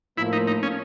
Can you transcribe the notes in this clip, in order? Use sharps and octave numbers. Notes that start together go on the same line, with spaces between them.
A2 F3 A#3 E4
D#4
D#4
C#4